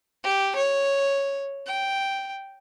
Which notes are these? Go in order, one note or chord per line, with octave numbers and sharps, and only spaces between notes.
G4
C#5
G5